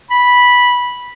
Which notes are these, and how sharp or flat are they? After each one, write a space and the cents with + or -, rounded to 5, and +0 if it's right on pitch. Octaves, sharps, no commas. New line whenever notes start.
B5 -10